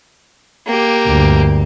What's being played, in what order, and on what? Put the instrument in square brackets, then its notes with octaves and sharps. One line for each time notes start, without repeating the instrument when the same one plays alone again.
[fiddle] A#3 G4
[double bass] D2 G2